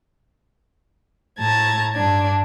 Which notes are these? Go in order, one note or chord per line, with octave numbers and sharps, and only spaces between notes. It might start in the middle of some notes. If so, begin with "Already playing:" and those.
A2 A5 A#5 G#6
G2 D4 G#6